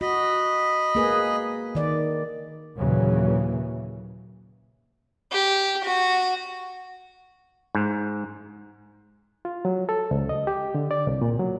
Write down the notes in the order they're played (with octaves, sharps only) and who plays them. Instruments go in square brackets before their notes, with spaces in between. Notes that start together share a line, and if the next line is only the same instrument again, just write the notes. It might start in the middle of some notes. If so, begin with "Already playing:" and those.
[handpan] F#4 [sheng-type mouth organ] D#5 B5
[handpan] A#3 G#4 B4
D#3 D5
[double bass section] D#2 A#2 C#3 E3 F#3
[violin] G4
F#4
[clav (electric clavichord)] G#2
[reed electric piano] F4
F#3
A4
C#2
D#5
G4
D3
D5
C2
A#2
F#3